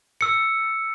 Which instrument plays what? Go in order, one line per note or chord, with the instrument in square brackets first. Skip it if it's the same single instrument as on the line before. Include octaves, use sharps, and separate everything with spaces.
[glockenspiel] E6 C#7